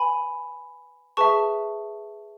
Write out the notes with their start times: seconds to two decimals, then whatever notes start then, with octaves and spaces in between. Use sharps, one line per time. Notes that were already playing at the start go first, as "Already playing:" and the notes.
Already playing: B4 G#5 B5
1.17 G#4 B4 E5 A5 C#6